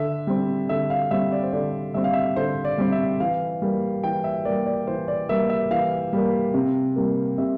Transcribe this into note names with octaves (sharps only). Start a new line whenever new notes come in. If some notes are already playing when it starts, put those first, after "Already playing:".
Already playing: D3 E5
G3 C4
D3 E5
F5
G3 C4 E5
D5
C5
D3 D5
G3 C4 E5
F5
E5
D3 C5
D5
G3 C4
E5
E3 F5
G3 A#3
E3 G5
E5
G3 A#3 D5
D5
E3 C5
D5
G3 A#3 E5
E5
E3 F5
G3 A#3
C3
G3 A#3
C3 E5